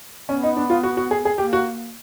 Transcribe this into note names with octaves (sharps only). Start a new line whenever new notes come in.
B3 C#4
D#4
D4
F4
F#4
F#4
G#4
G#4
A#3 G4
F#4